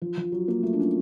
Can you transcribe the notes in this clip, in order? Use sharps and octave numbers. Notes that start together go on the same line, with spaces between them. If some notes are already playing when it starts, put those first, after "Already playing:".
F3
F3
F#3
A#3
A3
D4
C#4